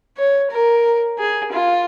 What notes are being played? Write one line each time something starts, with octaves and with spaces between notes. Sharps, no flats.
C#5
A#4
G#4
F4